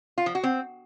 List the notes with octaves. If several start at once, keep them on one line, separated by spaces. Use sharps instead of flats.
F4
F3
F#4
C4